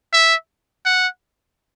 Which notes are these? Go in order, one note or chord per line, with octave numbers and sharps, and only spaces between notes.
E5
F#5